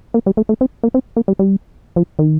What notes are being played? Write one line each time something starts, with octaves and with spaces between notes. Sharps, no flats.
A#3
G3
A3
A3
C4
A#3
C4
A#3
G3
G3
F3
D#3